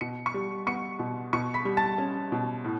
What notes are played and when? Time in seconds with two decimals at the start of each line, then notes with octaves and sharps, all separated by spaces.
0.01 B2 C#7
0.26 C#6 C#7
0.34 G3
0.67 B3 C#6 C#7
0.99 B2
1.33 B2 C#6 C#7
1.54 B5 B6
1.65 G3
1.77 A5 A6
1.98 C#4
2.32 B2
2.64 A2